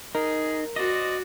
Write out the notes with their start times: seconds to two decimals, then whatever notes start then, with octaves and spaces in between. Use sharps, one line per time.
0.15 D#4 G#4 A#4
0.76 F#4 C5 D5 D#5